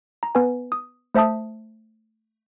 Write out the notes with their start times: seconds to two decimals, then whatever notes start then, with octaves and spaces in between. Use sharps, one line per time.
0.23 A#5
0.35 B3 B4 G#5
0.72 D#6
1.14 A3 C5 E5 A5 D#6